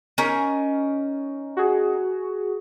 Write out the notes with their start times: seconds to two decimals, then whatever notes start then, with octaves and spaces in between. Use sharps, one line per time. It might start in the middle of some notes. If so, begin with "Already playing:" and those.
0.18 C#4 D#4 A#4
1.57 F#4 G#4